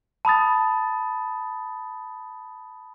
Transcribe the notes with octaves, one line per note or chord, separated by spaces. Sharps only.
A5 B5 D#6 A6